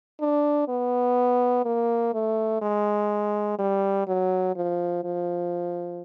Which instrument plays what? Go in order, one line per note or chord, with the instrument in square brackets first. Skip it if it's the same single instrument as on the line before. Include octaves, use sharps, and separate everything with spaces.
[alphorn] D4
B3
A#3
A3
G#3
G3
F#3
F3
F3